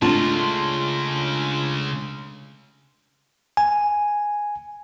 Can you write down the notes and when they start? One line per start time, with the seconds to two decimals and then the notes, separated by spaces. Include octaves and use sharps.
0.02 C#3 G#3 A3 D4 F4 A5
3.57 G#5